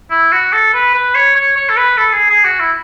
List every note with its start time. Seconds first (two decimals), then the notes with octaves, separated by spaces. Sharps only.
0.10 E4
0.32 F#4
0.52 A4
0.74 B4
0.94 B4
1.15 C#5
1.35 C#5
1.56 C#5
1.69 A4
1.76 B4
1.97 A4
2.13 G#4
2.29 G#4
2.44 F#4
2.59 E4